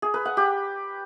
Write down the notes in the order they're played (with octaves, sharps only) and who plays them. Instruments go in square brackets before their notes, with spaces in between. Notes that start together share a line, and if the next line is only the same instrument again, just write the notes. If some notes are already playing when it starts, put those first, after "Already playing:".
[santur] G#4
B4
F#5
G4